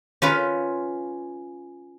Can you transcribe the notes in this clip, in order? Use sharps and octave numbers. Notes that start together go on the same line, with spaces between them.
C#4 F4 B4